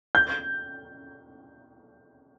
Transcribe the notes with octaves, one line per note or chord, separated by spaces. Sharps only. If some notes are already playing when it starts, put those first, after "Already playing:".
G6